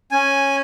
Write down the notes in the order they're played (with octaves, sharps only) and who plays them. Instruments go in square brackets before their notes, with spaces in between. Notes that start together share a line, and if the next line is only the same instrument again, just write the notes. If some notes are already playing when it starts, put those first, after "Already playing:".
[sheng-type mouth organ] C#4 G#5